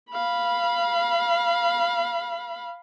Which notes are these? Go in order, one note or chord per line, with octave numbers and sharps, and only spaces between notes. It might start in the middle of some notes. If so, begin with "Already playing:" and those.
F5 B5